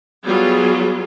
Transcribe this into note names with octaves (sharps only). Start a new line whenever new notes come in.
F#3 G3 B3 F4 G#4